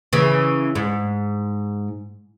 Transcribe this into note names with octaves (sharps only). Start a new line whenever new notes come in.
C#3 E3
G#2